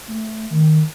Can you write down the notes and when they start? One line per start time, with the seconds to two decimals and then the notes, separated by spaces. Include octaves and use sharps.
0.08 A3
0.51 D#3